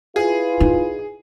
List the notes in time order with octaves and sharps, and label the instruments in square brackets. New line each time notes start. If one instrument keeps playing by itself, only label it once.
[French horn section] E4 F4 B4 [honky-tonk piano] G#4
[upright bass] D#4